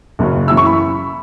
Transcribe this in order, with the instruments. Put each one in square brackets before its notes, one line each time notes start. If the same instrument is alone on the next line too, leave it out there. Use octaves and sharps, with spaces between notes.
[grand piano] F#1 F#2 C#3 F#3 C#4
F#2 E3 C#4 E4 E6
C#6
B5